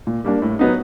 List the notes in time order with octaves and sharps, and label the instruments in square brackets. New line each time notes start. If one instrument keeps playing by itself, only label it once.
[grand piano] A#2
G3 A#3 D4
A2
F#3 B3 D#4